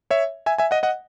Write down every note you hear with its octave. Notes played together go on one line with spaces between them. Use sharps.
C#5 E5
E5 G#5
E5 G#5
D#5 F#5
D#5 F#5